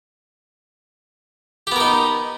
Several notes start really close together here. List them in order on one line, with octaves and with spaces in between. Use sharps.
G4 B3 A#4 D#4